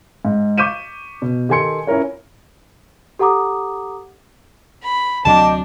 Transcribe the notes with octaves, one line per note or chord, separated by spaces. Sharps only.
G#2
C#6 D6 G6 B6 D#7 E7
B2
D#3 G4 A4 G#5 C6 C#7
C#4 E4 F4 A#4 C#5
G4 A4 F#5 A#5 D6 D#6
B5
D2 C3 F#3 D4 D#5 G5 A5 D6